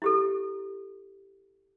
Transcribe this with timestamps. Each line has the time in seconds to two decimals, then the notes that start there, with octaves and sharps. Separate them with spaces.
0.02 E4 G4 A4